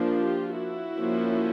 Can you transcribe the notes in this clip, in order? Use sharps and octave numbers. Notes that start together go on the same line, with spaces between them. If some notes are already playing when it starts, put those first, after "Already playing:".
Already playing: F3 A#3 D4
F4 G4
E4 F#4
F3 A#3 C#4